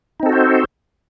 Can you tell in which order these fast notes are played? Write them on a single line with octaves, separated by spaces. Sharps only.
D#4 C4 A4 F#4 C5